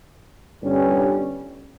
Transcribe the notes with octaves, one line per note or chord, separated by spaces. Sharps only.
G1 G2 G3 C#4